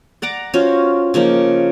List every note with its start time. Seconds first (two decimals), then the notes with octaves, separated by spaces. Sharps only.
0.22 D5 F#5 A#5 D6
0.54 C#4 F4 F#4 C5
1.14 C#3 F3 A#3 D#4